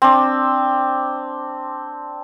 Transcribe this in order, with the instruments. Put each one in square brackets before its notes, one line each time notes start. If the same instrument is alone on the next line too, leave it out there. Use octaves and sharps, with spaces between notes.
[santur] C4 D4